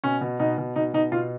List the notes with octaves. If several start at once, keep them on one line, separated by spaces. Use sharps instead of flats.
B2 C#4
B2
B2 D#4
B2
B2 D#4
B2 D#4
B2 F4